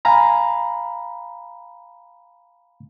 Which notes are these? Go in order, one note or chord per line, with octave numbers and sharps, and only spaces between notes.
F5 G#5 A#5 B5